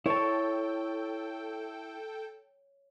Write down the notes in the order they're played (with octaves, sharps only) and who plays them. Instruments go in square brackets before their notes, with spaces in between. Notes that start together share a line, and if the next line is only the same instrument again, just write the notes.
[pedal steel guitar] E4 A5 [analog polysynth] A4 G5 [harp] C#5